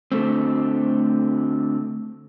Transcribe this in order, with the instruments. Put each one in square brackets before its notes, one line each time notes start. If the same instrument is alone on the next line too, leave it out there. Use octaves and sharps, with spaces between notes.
[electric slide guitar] D3 A3 C4